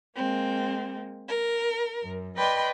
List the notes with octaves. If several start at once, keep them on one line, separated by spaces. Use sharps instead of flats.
G#3 A#3 C4
A#4
F#2
B4 D5 D#5 G5 B5 C6